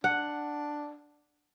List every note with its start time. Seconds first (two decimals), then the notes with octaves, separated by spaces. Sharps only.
0.04 D4 F#5